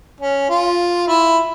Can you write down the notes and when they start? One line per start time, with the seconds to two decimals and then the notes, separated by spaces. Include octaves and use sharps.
0.20 C#4
0.49 F4
1.08 E4